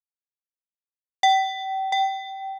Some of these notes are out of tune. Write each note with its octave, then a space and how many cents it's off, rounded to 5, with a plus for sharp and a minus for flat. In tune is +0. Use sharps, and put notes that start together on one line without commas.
G5 -35
G5 -20